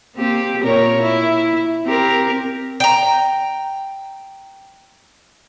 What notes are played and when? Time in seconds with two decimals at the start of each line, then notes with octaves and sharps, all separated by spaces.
0.16 A#3 C4 G4
0.62 A#2 A#4 C#5
1.02 E4
1.86 C4 G4 A#4
2.80 G5 A#5